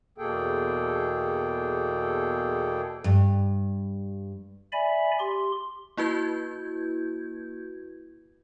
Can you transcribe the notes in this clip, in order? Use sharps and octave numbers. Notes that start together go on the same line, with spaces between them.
E2 B2 A#3 G#4 A4 G5
G2
D5 E5 G#5 B5
G4 C6
A#3 E4 F#4 B4 G6 G#6